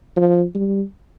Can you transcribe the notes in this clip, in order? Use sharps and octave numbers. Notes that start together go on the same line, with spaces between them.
F3
G3